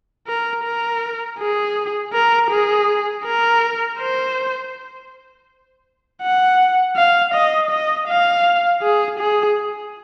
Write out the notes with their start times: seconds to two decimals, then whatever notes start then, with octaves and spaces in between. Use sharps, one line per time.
0.27 A#4
0.64 A#4
1.38 G#4
2.13 A#4
2.50 G#4
3.25 A#4
3.99 C5
6.22 F#5
6.96 F5
7.34 D#5
7.71 D#5
8.08 F5
8.82 G#4
9.19 G#4